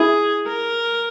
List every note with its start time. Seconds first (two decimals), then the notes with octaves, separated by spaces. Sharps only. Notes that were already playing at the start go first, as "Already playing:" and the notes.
Already playing: E4 G#4
0.47 A#4